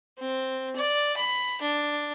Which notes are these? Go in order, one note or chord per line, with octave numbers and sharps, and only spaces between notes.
C4
D5
B5
D4